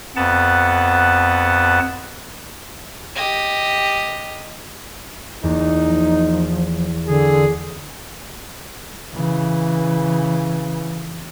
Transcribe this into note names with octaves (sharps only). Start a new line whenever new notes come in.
F2 B3 F#5 A5
G4 D#5
E2 A#3 D#4
F3
D3 G#4
C#3 E3